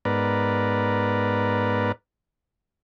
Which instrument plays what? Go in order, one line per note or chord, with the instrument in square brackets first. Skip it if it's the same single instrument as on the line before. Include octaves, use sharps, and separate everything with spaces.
[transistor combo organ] G#2 B3 A#4 B4 D5